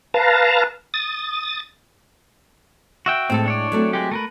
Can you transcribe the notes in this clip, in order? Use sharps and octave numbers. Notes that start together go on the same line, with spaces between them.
B4 F5 A5 A#5
D#6 A6
F#4 E5 G5
A2 G#3 C4 A4
D4 C#5 D5
F#3 A3 C4
G#3 G4
A3 A#4 B4